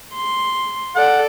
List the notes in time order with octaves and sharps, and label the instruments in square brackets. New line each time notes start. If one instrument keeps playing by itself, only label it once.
[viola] C6
[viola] A4 D5 [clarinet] F#5